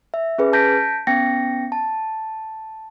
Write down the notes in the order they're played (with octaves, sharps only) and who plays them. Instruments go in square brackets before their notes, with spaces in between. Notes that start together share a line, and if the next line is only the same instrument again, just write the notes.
[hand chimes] E5
C#4 G#4 B4
A5 G6 A#6 B6 D7
B3 C#4 G5 A#6 C#7
A5